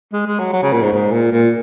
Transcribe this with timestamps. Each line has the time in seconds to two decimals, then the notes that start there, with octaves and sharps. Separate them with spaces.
0.13 G#3
0.26 G#3
0.39 F#3
0.53 F#3
0.63 C#3
0.73 A#2
0.82 G#2
0.93 G#2
1.12 A#2
1.32 A#2